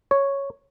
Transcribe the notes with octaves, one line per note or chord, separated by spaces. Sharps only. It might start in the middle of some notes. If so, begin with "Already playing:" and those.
C#5